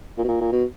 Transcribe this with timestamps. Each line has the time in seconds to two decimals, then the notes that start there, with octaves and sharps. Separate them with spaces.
0.18 A#2
0.24 B2
0.28 A#2
0.41 A#2
0.52 B2